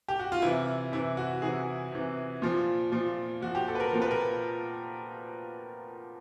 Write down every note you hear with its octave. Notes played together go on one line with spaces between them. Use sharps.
G4
F#4
F4
C3 E3 E4
C3 E3 E4
F#4
C3 E3 G#4
C3 E3
A#2 F3
A#2 F3
A#2 F3 F#4
G4
A4
B4
A#4
A#2 F3 A#4
B4
A#4